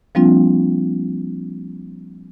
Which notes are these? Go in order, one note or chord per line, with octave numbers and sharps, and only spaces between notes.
F3 G3 A#3 C4 D4 F4